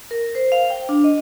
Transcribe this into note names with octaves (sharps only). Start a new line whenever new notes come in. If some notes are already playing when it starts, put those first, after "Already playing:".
A#4
C5
F5
G5
D4
D#5